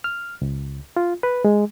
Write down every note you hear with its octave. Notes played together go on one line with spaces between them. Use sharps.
F6
C#2
F4
B4
G#3